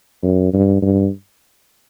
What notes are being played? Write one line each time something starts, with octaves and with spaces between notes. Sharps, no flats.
F#2
G2
G2